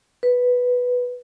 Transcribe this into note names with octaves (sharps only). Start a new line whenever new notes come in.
B4